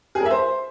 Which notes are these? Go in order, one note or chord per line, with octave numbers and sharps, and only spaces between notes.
G#4
A#4
E5
C5